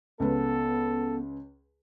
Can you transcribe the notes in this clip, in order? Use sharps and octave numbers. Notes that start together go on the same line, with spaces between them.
C#2 B3 A4 B4